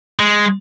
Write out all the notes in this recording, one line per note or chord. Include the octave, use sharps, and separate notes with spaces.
G#3